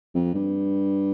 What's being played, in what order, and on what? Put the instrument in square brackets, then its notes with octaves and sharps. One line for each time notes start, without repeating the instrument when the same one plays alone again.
[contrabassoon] F2
G2